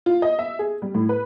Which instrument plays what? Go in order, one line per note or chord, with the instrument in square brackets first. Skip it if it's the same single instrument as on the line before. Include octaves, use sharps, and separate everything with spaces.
[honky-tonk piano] F4
D#5
E5
G#4
G3
A2
B4